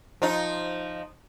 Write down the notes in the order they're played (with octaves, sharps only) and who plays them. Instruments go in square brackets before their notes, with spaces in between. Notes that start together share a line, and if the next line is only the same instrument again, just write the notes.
[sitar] F3 D#4